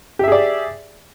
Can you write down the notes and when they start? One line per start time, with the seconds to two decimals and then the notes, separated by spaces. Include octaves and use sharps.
0.19 G4
0.24 E5
0.28 G#4
0.32 D5